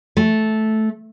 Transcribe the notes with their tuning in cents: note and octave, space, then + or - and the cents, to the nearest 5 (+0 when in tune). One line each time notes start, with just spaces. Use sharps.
A3 -10